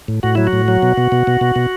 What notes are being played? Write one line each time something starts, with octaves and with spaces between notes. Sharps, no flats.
A2
A2 F#4
F#3 E4
F#4
A2
F#3
B2
B2
B2
B2
B2
B2